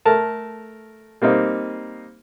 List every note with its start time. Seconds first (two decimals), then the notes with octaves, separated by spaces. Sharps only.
0.05 A3 A#4 A5
1.22 G3 A#3 C4 D#4